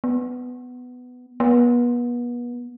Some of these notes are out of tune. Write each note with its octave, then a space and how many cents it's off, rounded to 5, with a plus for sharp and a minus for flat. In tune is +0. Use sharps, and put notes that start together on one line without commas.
B3 +10
B3 -35